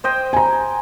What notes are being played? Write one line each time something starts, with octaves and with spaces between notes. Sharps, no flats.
C5 D#5 G5
G#5 A#5